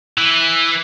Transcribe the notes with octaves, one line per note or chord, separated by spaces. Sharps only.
E3